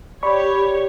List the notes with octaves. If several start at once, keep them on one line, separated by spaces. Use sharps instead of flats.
G4 C#5 D5 B5 C#6